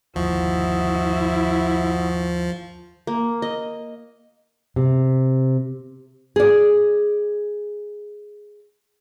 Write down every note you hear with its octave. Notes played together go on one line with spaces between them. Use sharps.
G1 D#2 F3 E4 F#4 D#5
A#3
D#5
C3
G#4 D5